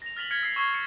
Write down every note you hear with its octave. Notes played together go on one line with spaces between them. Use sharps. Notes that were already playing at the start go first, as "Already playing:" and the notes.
A#6 F7
F6 A6 B6 F7 F#7
F6 G#6 B6 C#7
E6 C7
C#6 E6 G#6 C7
A6 C#7